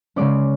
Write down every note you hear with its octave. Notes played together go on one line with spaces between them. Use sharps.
C#3 G#3 C#4 D5